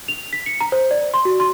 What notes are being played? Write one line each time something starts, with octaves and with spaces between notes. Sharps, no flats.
F7
B6
C#7
A#5
C5
D5
C6
F#4
C6